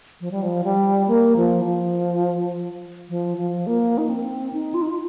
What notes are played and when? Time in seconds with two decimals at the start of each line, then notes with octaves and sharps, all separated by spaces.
0.21 F3
0.31 G3
0.42 F3
0.64 G3
1.07 A#3
1.36 F3
1.65 F3
3.09 F3
3.38 F3
3.67 A#3
3.98 D#4
4.09 C4
4.53 D#4
4.74 F4
4.82 D#4
4.89 F4